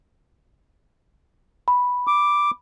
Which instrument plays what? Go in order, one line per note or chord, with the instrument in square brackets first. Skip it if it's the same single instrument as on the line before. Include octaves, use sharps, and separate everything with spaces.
[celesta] B5
[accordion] D6